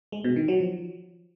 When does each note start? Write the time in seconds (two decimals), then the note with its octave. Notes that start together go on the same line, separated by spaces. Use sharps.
0.12 G#3
0.24 B2
0.36 D#3
0.48 F#3
0.60 F3